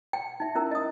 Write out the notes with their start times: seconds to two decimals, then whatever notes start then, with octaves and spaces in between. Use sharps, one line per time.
0.13 G5
0.40 D#4 E5
0.55 C#4 E4 A#4 E6
0.71 D#5 D#6